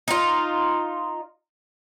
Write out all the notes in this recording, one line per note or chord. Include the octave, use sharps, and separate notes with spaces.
D#4 F4